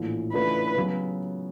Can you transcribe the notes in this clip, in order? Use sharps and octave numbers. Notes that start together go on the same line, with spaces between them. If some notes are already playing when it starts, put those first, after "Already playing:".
Already playing: A#1 A2 E3
C#3 E3 A3 D4 F4 B4
C#3 F#3 B3